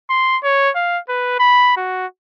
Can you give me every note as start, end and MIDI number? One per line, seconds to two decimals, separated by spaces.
0.10 0.37 84
0.43 0.70 73
0.75 0.99 77
1.09 1.36 71
1.39 1.73 83
1.77 2.06 66